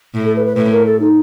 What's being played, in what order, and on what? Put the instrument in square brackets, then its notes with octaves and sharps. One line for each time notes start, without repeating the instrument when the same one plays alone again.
[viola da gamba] A2
[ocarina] A4
B4
B4
[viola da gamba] A2 [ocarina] B4
[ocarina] A#4
A4
D#4